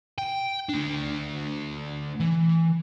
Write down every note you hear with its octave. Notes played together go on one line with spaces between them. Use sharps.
G5
A3 D4
E3